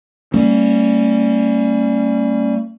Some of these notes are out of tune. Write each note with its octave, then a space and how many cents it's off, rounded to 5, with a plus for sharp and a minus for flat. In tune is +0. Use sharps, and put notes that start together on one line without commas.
G3 +0 A#3 -40 C#4 -10